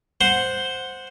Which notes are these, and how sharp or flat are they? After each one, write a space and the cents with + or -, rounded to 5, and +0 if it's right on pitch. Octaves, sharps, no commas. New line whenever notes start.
C5 +0 F#5 -10 C6 +0